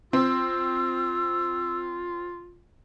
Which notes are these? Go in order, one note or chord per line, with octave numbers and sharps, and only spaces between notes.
C4 F4 E6